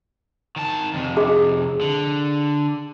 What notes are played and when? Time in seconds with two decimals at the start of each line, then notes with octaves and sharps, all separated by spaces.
0.56 D#3 A5
0.94 F2 C3
1.17 G#4
1.81 D3